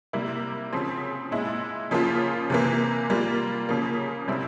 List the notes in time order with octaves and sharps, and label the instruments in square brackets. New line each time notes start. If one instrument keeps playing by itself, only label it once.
[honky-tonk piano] C3 G3 A#3 E4
C#3 F3 C4
A#2 G#3 E4
C#3 F3 A#3 F4
C3 E3 A#3
G3 A#3 F4
C#3 F3 A#3
C3 G3 C4 E4